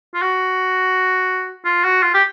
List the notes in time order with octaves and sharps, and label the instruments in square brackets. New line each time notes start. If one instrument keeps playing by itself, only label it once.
[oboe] F4
F#4
F4
F#4
F4
G4